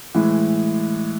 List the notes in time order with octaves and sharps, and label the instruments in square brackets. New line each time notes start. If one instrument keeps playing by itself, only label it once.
[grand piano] A2 E3 G#3